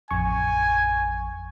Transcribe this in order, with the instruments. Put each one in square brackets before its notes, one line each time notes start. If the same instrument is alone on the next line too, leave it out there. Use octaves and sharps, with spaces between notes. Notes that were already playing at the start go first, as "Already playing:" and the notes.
[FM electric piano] A1 F2 C#6 [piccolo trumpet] G#5